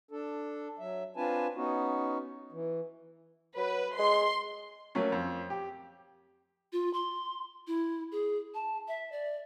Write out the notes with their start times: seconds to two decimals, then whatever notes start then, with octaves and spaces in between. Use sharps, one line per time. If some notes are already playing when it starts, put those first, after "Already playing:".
0.11 D4 A4
0.79 F#3 E5
1.16 C4 D4 F4 B4 G#5 A5
1.56 B3 C#4 D#4 F#4
2.52 E3
3.57 F#3 B4
3.99 G#3 C6
4.95 F#3 A3 A#3 C#4
5.12 F2
5.50 G4
6.73 F4
6.93 C6
7.67 E4
8.12 G#4
8.54 A5
8.88 E5
9.12 D5